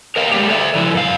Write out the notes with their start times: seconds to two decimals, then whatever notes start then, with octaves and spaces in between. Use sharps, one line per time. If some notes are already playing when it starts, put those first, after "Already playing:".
0.16 A#4 D#5 F5 G5
0.32 G#3 A#3 G4
0.48 A4 D5 E5
0.75 C#3 F3 E4
0.94 F#2 F5